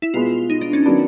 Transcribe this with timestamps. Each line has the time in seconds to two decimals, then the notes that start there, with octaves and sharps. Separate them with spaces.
0.02 E4
0.14 B2 G#3 B3 F4
0.50 D#4
0.61 D4
0.73 C#4
0.86 D#3 F#3 B3 D4